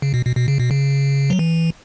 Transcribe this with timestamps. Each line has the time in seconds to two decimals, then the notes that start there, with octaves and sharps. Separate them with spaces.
0.02 C#3
0.14 B2
0.26 B2
0.37 B2
0.48 C#3
0.60 B2
0.71 C#3
1.30 F#3
1.39 E3